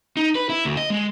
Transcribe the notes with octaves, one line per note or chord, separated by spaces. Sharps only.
D#4
B4
E4
D2
D#5
G#3